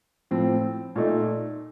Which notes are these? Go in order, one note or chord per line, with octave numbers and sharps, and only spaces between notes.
A2 F3 C4
A#2 A3 D#4